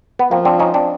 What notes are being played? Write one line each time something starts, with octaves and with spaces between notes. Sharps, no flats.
B3
F3 A#3 C4
C4 D4
C#4 D#4
C4 D4